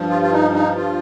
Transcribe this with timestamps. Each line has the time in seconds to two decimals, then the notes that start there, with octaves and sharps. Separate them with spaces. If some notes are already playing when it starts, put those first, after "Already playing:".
Already playing: G2 F3
0.10 F4
0.22 F4
0.32 D#4
0.53 D#4
0.76 F4